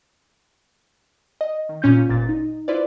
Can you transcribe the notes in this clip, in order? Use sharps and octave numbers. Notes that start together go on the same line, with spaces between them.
D#5
D#3
A#2 C#4 F4 G6
G1 A#2 A6
D#4
E4 F4 B4 C5 D5